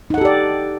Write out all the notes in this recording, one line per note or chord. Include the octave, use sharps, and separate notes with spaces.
D#4 G4 A4 D5 F#5